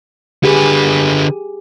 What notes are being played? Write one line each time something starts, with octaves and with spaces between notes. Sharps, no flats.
D3 G4 G#4 B4